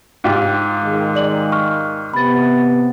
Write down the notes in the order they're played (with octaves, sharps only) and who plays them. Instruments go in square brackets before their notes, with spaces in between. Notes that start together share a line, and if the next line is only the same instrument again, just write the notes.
[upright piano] G#2 F4 G4
[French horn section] D#3 G#3
[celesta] D5 F#7
C#6 F6
[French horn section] C3 B3 [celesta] B5 A6